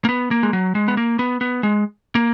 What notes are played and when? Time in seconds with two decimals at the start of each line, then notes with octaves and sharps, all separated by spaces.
0.05 A#3
0.09 B3
0.31 A#3
0.43 G#3
0.53 F#3
0.75 G#3
0.88 B3
0.97 A#3
1.19 B3
1.41 B3
1.63 G#3
2.15 A#3